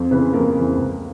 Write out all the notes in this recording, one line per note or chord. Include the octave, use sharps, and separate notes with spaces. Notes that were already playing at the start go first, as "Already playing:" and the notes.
Already playing: F2 C4 C5
C#3 E3 B3 B4
F2 A#3 A#4
C#3 E3
C#2